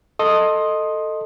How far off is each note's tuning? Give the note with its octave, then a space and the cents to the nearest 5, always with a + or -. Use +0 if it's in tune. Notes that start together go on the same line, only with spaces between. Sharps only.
A4 +10 D#5 +0 C6 +15